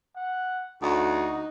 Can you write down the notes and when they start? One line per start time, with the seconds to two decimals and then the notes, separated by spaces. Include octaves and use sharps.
0.16 F#5
0.82 D2 D#4 F#4